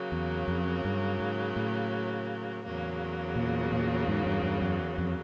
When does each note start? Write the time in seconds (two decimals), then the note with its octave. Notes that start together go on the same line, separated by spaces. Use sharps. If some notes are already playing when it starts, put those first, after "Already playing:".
Already playing: C#3 F#3 A#3
0.12 E2
0.48 F2
0.85 G2
1.20 G#2
1.56 A2
2.64 E2 C#3 F#3 A#3
3.36 A#2
3.72 A#2
4.08 G#2
4.26 G2
4.43 G2
4.61 F#2
4.98 F2